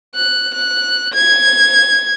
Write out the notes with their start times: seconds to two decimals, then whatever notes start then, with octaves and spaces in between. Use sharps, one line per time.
0.15 F#6
0.55 F#6
1.14 G#6